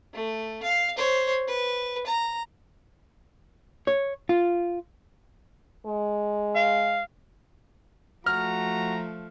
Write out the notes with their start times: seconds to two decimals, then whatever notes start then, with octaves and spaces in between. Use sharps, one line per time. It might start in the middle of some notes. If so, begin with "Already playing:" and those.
0.14 A3
0.63 F5
0.97 C5 C#5
1.48 B4
2.07 A#5
3.87 C#5
4.29 F4
5.87 G#3
6.55 F5
8.26 F3 A3 F#4 A#5 F6